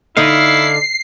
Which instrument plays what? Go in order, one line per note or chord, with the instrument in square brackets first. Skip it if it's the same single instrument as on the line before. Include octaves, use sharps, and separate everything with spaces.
[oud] D3 D#4 [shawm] E4 [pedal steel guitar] F5 [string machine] C7